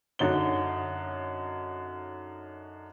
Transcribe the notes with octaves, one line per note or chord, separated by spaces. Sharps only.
F#2 D3 D#4 C#5 G7